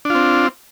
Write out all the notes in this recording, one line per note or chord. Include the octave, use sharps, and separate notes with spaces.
C4 D4 F4